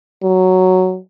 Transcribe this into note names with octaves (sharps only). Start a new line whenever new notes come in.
F#3